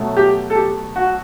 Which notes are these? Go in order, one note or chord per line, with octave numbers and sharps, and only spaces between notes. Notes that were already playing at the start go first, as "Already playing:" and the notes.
Already playing: B2 F#3 A3
G4
A4
G4
F#4